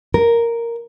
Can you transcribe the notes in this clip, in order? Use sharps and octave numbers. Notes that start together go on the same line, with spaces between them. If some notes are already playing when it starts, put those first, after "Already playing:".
A#4